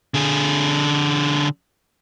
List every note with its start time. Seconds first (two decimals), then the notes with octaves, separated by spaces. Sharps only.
0.14 D3 G#4